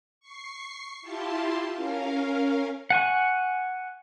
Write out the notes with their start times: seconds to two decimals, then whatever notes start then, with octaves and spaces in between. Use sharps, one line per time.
0.20 C#6 C7
1.02 E4 F4 G4 A5 C6
1.73 C#4 A#4 F5
2.90 F#5 G#5 C#6